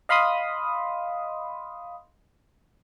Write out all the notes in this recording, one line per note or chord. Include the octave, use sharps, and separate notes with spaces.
D#5 F5 B5 C6 D#6